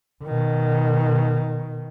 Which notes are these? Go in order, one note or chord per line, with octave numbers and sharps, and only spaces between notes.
B2 D#3